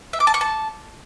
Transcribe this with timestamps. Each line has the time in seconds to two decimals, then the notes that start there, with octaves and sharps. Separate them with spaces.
0.13 E5
0.20 D6
0.27 A5
0.34 C#6
0.41 A5